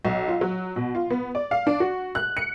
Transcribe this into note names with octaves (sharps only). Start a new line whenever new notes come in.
B1
F4
F#3
B2
F4
B3
D5
F5
D4
F#4
F#6
C#7